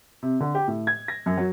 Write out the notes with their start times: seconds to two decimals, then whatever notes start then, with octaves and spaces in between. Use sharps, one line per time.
0.22 C3
0.40 D3
0.55 G4
0.68 A2
0.87 G#6
1.08 A#6
1.26 F#2
1.37 F#3